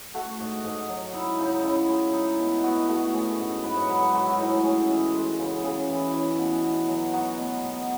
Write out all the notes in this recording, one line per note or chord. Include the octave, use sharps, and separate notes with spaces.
A3 F#4
G#2
G#2
F#3
D#4 E4
C#3 D#4
C#3 E4
G#3
D#4
B2
B2 F#4
A3 F#4
C#4 G#4
G#2
G#2 B4
C#5
F#3 B4
G#4
G#3 F#4
E4
A2 D#4
C#4 G#4
E3
G#3
C#3
C#3 G#4
E3
C#4
B2
B2
F#3
D#4 F#4
B2
B2